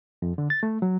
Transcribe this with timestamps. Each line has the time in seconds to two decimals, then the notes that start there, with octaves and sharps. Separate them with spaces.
0.22 F2
0.38 D3
0.50 A6
0.63 A3
0.82 F#3